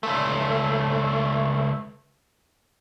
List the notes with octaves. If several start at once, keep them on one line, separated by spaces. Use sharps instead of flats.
C#2 A3